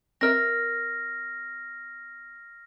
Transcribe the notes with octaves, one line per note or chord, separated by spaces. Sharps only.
C4 A#4 E5 F6 A#6